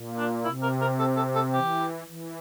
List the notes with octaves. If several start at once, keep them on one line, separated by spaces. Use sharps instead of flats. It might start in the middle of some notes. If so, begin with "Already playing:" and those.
Already playing: A#2
D4
C3 E4
A#4
A#4
A4
A4
A4
E3 G4
E3